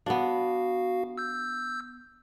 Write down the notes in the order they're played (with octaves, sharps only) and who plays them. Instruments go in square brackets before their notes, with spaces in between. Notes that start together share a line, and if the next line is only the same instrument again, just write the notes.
[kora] B3 D4 [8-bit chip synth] F#4 F5
[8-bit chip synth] E6 G6